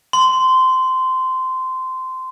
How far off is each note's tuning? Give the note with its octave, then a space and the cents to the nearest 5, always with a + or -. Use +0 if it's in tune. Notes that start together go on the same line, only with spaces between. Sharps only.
C6 -15